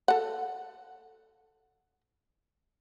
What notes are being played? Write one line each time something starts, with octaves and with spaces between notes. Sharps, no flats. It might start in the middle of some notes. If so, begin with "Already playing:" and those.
A4 F#5